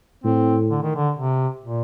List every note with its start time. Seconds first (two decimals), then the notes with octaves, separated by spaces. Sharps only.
0.24 A2 C4
0.70 D3
0.83 D#3
0.96 D3
1.16 C3
1.62 A#2